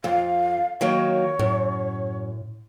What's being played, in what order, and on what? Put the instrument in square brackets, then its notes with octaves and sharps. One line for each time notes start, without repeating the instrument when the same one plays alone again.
[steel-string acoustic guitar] F2 [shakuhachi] F5
[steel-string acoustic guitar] D#3 F#3 A#3 [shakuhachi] C#5
[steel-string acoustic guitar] F#2 [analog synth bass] A2